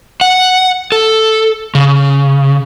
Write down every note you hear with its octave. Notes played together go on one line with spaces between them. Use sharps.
F#5
A4
C#3